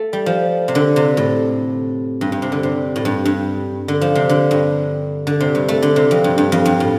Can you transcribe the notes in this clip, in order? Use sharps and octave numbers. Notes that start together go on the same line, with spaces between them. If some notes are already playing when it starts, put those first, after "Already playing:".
Already playing: A3
G3
F3
C3
D3
C3
A2
G2
G2
C3
D3
C3
A2
G2
G2
D3
F3
C3
D3
G2
D3
C3
G2
A3
D3
C3
F2
G2
G2
F2
G2
A2